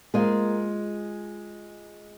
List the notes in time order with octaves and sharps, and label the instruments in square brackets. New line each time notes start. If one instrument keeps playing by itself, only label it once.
[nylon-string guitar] G#3 F4 G#4 C5 [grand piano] A#3